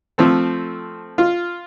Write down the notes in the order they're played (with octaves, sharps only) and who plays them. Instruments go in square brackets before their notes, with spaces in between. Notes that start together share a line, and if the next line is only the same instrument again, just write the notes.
[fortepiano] F3 A3 C4 A4
F4